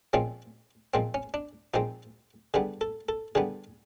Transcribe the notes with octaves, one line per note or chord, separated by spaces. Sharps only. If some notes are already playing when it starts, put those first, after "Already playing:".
A#2 F3 G#3 C4 C#4
A#2 F3 G#3 C4
C#4
D4
A#2 F3 G#3 C4 D#4
D3 G3 B3 G#4
A4
A4
D3 G3 B3 G#4